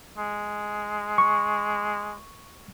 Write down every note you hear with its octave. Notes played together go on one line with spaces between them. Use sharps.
G#3
C#6